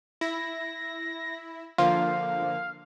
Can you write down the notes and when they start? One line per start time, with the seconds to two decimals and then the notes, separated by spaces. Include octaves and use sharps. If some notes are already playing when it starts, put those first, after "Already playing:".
0.21 E4 A#6
1.78 D3 F3 A#3 F4 F5